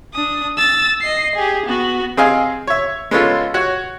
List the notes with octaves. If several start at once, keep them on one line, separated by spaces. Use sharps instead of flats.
D4 D#6
E6 A6
D#5 C7
G4 G#4
B3 F#4
C4 G#4 D#5 F5 G#5
C#5 E5
G#3 B3 C#4 F4 A4
F#4 C#5 F#5